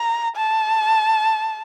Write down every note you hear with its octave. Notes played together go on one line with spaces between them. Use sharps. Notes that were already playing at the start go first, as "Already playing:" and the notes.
Already playing: A#5
A5